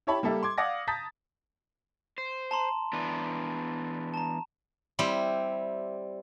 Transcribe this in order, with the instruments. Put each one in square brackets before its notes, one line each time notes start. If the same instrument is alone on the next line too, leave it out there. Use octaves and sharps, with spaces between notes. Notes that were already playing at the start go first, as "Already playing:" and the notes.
[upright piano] E4 G4 C#5 E5 A5 B5
G3 A#3 G4 A4 E5
C6 D6 G#6
D5 F5 F#5 D6 D#6 A#6
A5 A#5 D#6 G6 A6 B6
[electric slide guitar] C5
[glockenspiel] A5 A#5 C6
[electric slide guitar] E3 B3 D4
[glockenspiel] A5 A#5
[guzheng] G3 C4 E4